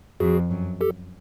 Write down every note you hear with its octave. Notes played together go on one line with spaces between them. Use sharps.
F2 F#4 G#4
F#2
G4 A4